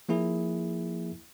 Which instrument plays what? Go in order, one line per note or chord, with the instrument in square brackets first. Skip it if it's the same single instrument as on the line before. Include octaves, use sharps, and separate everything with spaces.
[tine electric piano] F3 A#3 E4 G#4